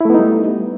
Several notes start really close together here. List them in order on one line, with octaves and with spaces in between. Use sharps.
E4 A3 B3 D#4 G3